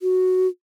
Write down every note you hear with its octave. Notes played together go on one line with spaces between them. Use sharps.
F#4